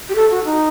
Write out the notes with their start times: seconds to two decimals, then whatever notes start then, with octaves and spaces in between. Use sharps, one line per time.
0.09 G4
0.15 A4
0.30 F#4
0.45 D#4